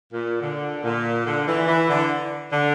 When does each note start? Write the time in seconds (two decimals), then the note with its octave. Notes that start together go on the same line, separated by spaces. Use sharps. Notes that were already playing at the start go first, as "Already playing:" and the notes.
0.14 A#2
0.41 D3
0.84 A#2
1.26 D3
1.47 E3
1.68 E3
1.90 D3
2.52 D3